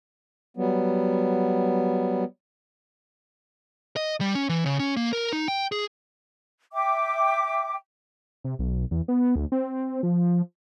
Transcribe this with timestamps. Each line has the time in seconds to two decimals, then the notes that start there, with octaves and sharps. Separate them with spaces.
0.57 F#3 G3 B3
3.96 D#5
4.21 G3
4.35 C#4
4.49 E3
4.66 C#3
4.80 C#4
4.97 A#3
5.13 A#4
5.33 D#4
5.48 G5
5.72 G#4
6.73 E5 G5 D6
8.44 C3
8.59 B1
8.91 E2
9.08 B3
9.36 D2
9.52 C4
10.03 F3